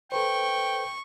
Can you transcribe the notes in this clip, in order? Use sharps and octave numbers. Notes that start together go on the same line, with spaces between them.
A4 B4 C5 G5 C#6